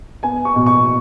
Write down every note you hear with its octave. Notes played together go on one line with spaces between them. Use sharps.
B3 G#5
C#6
B2
C#6